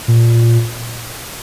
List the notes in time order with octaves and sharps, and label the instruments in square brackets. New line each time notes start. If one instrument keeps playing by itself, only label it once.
[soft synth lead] A#2